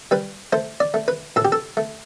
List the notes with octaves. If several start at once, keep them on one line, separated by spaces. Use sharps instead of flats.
G3 B4
A3 C5
D5
A3
B4
A2 A4
G4
A4
A3